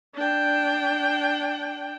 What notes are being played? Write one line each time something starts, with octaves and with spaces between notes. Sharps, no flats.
D4 G5